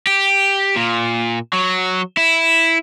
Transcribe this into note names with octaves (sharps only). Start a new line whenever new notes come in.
G4
A#2
F#3
E4